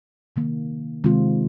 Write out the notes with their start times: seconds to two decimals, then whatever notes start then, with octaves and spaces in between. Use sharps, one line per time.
0.36 C3 D#3 A#3
1.04 C3 D#3 G#3 C4 F4